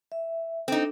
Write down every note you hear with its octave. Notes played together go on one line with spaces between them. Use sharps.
E5
C4 D4 D#4 A4